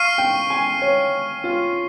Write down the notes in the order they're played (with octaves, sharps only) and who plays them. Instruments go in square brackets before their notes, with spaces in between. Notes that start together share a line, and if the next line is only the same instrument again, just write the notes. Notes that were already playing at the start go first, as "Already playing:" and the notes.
Already playing: [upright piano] F5 [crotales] C#6 F6 C7 D#7
[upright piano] G5
G#5
C#5
F4